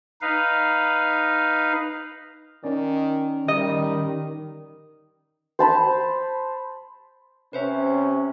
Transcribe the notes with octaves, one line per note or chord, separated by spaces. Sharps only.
D#4 B4 F5
D#3 C#4 D5
D#3 G3 D#5
C5 A5 B5
C3 C#4 B4 C5 E5